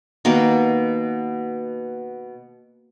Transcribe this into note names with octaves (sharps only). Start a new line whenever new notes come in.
B2 D#3 A#3